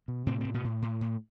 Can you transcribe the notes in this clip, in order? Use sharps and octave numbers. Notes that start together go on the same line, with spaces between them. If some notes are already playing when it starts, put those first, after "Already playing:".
B2
A2 C3 C4
A2 C3 C4
B2 B3
A2
A2
A2